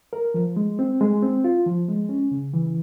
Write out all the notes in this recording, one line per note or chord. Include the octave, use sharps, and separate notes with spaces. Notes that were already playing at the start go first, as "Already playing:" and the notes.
A#4
F3
G#3
C4
G#3
C4
F4
F3
G#3
C#4
C#3
E3